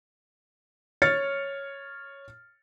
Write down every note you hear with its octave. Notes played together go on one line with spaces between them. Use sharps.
C#5 F6 A6 C#7